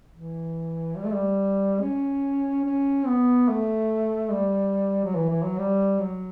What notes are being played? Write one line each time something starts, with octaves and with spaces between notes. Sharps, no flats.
E3
G3
A3
G3
C#4
C#4
B3
A3
G3
F#3
E3
E3
F#3
G3
F#3